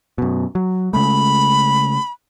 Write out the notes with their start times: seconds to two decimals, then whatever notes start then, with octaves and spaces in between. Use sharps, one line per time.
0.18 F#2 B2
0.55 F#3
0.93 C#3 G#3 A3 B5